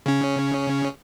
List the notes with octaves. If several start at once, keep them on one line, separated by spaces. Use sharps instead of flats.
C#3 C#4